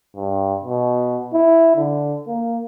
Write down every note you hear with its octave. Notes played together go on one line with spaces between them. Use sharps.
G2
B2
E4
D3
A#3